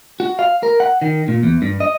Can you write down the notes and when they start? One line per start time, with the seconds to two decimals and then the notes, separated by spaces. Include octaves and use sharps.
0.20 F#4
0.39 F5
0.63 A#4
0.80 F#5
1.02 D#3
1.28 A#2
1.43 E2
1.62 G2
1.80 D#5